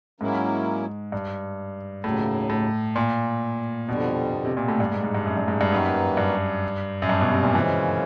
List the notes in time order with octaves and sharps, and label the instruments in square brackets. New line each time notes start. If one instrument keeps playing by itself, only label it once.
[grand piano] G#2 [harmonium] F#3 A#3 C#4 E4
[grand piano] G2
[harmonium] D#2 C#3 F#3 [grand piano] A2
[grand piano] A2
A#2
[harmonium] F2 D3 G3 [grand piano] B2
[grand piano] B2
C3
A#2
A2
G2
G#2
G#2
G2
F#2
G2
G#2
G2
[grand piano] F#2 [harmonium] G3 A#3 D#4 F#4 B4
[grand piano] G2
F#2
G2
B2
C3
A#2
[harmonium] F#2 C#3 F3 G#3 C#4 [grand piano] E3